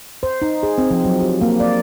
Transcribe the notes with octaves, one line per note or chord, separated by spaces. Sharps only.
C5
D#4
G#4
C4
F3
F#3
G4
A#3
D5